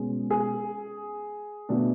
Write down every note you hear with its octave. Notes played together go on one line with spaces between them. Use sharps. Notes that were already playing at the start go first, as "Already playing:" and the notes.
Already playing: B2 G#3 C#4 G#4
G#4
B2 A3 D4